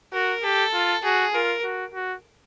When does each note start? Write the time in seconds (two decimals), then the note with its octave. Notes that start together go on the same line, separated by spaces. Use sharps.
0.13 F#4 A#4
0.43 G4 A4
0.74 F4
1.04 F#4 G#4
1.34 F4 A#4
1.64 F#4
1.94 F#4